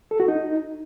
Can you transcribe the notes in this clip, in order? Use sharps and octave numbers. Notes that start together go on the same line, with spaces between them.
A4
F#4
D#4